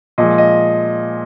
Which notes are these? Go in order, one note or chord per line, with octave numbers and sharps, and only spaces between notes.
A#2 F3 G#3 D#5
D#5